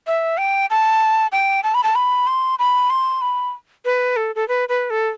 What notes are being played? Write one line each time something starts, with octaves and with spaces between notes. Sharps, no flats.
E5
G5
A5
G5
A5
B5
A5
B5
C6
B5
C6
B5
B4
A4
A4
B4
B4
A4